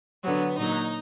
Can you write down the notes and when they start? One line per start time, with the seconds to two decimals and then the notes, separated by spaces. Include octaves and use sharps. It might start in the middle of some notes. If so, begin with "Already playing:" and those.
0.24 D3 F#3 B3
0.58 A#2 F#3 D#4